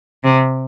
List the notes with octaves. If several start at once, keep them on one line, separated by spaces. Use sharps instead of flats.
C3